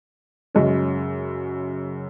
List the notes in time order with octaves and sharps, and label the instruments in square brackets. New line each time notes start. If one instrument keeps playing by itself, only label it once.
[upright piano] F#2 C#3 G#3 C#4